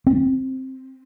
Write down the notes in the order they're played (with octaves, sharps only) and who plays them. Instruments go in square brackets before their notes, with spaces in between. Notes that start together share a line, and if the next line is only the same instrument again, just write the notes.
[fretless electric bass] C4